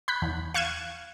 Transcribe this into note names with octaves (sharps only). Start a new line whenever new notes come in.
B5 F#6 G6 B6
E2
F5 C#6 F#6 G#6 D#7 E7